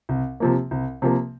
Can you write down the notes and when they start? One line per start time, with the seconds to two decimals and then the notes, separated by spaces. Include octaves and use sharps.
0.09 C2
0.40 C3 F3 A#3
0.71 C2
1.02 C3 F3 A#3